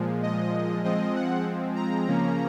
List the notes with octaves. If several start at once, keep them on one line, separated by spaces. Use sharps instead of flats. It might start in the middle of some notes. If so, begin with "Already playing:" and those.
Already playing: A#2 F3 G#3
D#5
F3 G#3 C4 D#5
F#5
A#5
C#3 F3 A#3 C#4